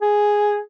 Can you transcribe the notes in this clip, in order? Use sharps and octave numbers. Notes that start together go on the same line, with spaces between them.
G#4